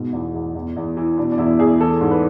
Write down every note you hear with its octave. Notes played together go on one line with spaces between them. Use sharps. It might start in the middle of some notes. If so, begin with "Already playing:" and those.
Already playing: G#2 B2
E2
E2
E2
E2
E3
B2 D4
D4
E2 E4
E2 G#4
E3 A4
G#2
B4